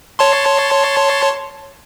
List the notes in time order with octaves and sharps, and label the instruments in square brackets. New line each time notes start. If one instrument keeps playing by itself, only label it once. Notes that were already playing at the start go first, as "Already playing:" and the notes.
[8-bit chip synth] C#5 A5 C6